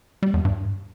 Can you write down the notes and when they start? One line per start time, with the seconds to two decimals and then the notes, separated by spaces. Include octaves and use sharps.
0.23 G3
0.34 E2
0.45 G2